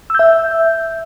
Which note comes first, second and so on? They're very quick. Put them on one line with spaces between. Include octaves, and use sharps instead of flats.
E6 G6 E5